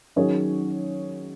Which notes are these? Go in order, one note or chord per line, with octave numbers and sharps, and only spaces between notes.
D#3 F#3 C#4 G#4 C#5